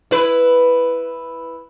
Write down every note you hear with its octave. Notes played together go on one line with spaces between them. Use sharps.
E4 B4